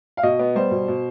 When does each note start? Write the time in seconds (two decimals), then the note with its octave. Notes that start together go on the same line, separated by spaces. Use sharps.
0.17 F5
0.23 B2 D#5
0.39 B3
0.55 G3 C5
0.71 B2
0.88 B2